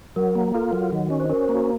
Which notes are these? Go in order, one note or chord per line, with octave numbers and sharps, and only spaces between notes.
F#3 A#4
A#3
F4 A4
F#3
D#3 F#4
C#4
C5
C#4 A#4
C5
A#3
F#4